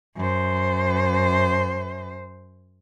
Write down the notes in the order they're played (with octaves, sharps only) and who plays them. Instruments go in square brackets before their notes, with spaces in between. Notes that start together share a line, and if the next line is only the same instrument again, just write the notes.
[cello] F#2 C5